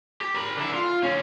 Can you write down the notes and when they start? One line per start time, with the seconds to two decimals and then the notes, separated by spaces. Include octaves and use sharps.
0.21 G4
0.34 A#4 B5
0.56 D3 E4
0.74 F4
1.03 D3 C#4